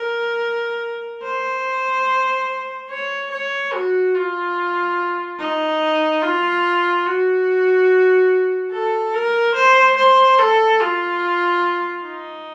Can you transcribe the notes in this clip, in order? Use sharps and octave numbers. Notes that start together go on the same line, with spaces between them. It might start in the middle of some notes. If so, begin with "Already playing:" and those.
Already playing: A#4
C5
C#5
C#5
F#4
F4
D#4
F4
F#4
A4
A#4
C5
C5
A4
F4
D#4